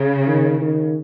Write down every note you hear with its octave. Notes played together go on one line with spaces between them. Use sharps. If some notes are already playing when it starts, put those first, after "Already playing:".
Already playing: C#3
D#3
D#3